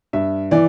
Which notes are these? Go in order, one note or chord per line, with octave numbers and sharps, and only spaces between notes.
G2 E5
E3 D5